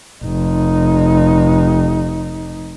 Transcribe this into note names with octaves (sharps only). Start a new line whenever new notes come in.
F1 D#4